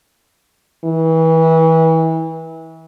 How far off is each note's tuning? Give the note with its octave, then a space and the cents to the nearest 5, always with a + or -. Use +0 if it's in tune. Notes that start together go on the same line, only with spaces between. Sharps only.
E3 -30